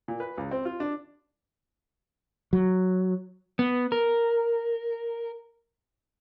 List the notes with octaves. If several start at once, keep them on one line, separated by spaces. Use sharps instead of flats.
A#2
B4
C#2
C4
F4
D4
F#3
B3
A#4